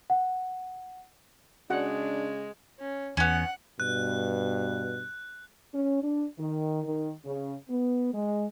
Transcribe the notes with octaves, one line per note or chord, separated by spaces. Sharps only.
F#5
C#3 G#3 D4 F#4 F#5
C#4
E2 B3 C#4 F#5
G2 B2 F#6
C#4
D4
D#3
D#3
C#3
B3
G#3